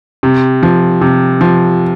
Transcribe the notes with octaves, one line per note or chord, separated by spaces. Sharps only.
C3
F3
C3
F3